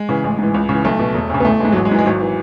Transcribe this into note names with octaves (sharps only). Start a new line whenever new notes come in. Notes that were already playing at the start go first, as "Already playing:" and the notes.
Already playing: G#3
C#3 E3
A1 G#3
G#2 E3
C#2
C#3 E3
B1 A3
B2
E1
D2 C#3
B3
A1 A3
G#2 E3 G#3
A1 F#3
G#3
G#2 E3
G#3
G#1 F#3
E3